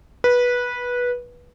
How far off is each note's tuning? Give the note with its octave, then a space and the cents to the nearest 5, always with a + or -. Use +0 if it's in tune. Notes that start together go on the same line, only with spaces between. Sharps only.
B4 -15